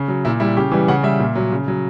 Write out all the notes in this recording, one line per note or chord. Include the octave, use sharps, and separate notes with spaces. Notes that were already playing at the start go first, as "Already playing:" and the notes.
Already playing: C#3
F#3
A#2 E4
G3 E4
C#3 G4
E3 G3
C#3 F#5
G3 E5
A#2
F#3
C#3
F#3